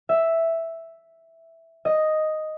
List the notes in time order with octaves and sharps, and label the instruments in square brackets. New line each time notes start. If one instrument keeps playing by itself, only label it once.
[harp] E5
D#5